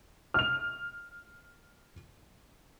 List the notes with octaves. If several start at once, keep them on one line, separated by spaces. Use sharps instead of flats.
F6 F7